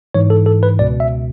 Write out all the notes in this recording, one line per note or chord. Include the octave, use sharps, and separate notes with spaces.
G#2 E3 C#5
A4
A4
B4
C#2 B2 D5
E5